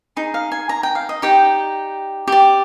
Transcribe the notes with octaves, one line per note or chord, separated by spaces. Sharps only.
D#4 G#4
F5
G#5
A#5
G5
F5
D#5
D#4 G4 D5 G5
G4 D5